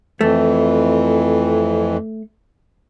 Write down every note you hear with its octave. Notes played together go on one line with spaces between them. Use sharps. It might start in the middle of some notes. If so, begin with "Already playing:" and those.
F2 E3 A3